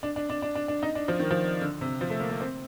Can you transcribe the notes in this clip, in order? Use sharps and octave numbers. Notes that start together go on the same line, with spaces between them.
D4
D4
D4
D4
D4
D4
D#4
D4
F3
D#3
F3
D3
C3
F3
A3
A#3
A#3
C4